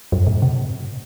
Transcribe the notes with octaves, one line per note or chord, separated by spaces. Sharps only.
F#2
A2
C3